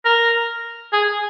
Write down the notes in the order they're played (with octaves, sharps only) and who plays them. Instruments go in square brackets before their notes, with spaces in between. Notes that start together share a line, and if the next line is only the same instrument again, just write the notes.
[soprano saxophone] A#4
G#4